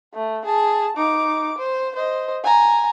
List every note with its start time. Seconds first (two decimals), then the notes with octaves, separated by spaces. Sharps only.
0.14 A3
0.45 G#4 A5
0.97 D#4 D6
1.58 C5
1.96 C5 D#5
2.44 G#5 A#5